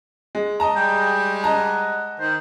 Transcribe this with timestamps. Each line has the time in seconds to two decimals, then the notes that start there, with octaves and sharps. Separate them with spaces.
0.35 G#3
0.60 D#5 A5 A#5
0.76 G3 G#3 G5
1.44 D#5 F#5 A5 A#5
2.20 D#3 C5